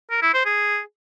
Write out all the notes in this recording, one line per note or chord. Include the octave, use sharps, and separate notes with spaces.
A#4
E4
C5
G#4